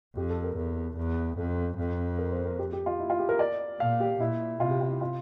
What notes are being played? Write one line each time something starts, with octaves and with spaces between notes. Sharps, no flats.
F2 G4
A4
A#4
E2 A#4
E2
F2 A4
F2
A#4
C5
A#4
G4
G4
F4
E4
F4
G4
A#4
D5
A#2 F5
G4
A#2 E4
C3 F4
G4
F4
E4
F4